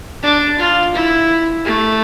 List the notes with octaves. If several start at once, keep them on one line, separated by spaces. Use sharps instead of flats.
D4
F4
E4
A3